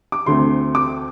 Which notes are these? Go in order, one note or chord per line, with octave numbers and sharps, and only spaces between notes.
D6
D2 D3 A3 C4 C6
D6